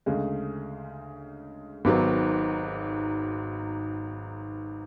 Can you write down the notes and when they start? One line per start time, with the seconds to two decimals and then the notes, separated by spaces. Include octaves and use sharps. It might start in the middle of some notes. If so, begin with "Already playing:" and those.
0.06 D2 C#3 G#3
1.85 G#1 G#2 F#3 B3